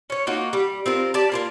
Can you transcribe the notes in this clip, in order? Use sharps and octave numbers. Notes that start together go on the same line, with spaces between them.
C#4 C#5
A#3 D#4 F4 F#4
G3
C4 F4 A#4
G4 D5 A5
A#3 F4 A#4